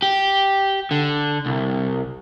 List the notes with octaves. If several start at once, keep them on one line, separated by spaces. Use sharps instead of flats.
G4
D3
C2